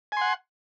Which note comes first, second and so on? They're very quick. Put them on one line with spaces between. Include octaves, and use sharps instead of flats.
G#5 C6 F#5